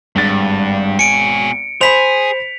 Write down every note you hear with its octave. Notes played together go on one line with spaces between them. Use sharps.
G#1 G2 A6
B2 G#5 C#7 D7
G#4 C5 B5 B6 F7